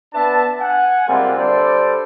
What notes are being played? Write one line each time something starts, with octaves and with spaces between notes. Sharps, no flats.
B3 D4 B4 E5 A5
F#5 G#5
C3 G3 G#3 A#3 C4 F4
D3 G3 A4 C5 D5